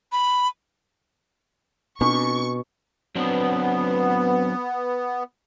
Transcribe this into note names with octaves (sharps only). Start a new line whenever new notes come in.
B5
B2 C4 D4 F#4 C#6
F#3 B3 C4 D4